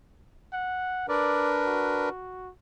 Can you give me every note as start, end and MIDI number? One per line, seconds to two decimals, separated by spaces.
0.53 1.06 78
1.09 2.09 62
1.09 2.09 70
1.09 2.09 71
1.09 1.49 74
1.66 2.50 66